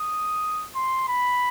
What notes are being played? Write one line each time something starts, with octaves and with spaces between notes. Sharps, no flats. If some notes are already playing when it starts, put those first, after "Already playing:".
Already playing: D#6
C6
B5